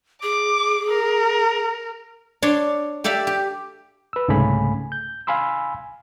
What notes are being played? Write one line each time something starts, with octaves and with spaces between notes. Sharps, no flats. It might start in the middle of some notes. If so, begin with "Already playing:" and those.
G#4 D6
A#4
D4 C#5 C6
G4 A4 D5 E5 F5
G4
B4 E6
C2 G#2 C#3 A3 G#5 B5
G6
F5 G#5 B5 C6 E6